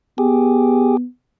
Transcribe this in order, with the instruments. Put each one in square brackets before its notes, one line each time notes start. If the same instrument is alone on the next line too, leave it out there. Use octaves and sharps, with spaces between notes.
[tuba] B3 [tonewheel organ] G4 G#4